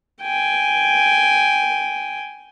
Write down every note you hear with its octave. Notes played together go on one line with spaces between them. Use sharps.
G5 G#5